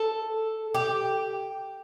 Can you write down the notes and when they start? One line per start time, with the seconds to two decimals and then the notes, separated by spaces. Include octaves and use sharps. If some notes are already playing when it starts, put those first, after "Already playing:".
Already playing: A4
0.75 G4